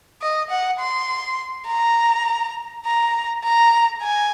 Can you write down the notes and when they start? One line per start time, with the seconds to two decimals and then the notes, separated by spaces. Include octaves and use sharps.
0.22 D#5
0.50 F#5
0.79 C6
1.67 A#5
2.86 A#5
3.44 A#5
4.03 G#5